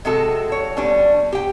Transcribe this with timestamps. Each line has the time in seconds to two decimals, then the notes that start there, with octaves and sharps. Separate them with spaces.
0.05 C3 G#3 F#4 A4
0.52 C#5
0.77 G3 B3 C#4 D4
1.33 G4 G5